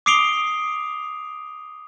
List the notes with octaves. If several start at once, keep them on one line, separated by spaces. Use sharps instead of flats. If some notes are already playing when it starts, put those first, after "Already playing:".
D6 D#6 C7 D7 F7 G7